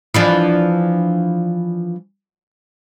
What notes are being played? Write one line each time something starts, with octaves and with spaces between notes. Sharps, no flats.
E3 F3 D4